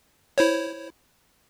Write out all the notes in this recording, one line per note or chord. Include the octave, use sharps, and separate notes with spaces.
E4 C5 C#5